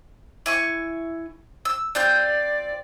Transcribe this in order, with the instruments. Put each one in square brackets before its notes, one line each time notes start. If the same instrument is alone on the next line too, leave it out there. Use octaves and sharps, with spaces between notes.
[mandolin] E4 G#5 C#6
E6
[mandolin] C4 F4 G6 [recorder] D5